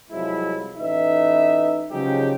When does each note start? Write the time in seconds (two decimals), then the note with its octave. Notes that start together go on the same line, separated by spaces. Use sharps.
0.11 C2 F3 F#3 G#3 E4
0.78 A1 D#4 B4 E5
1.91 C#3 F3 F#3 G#3 D#4 G4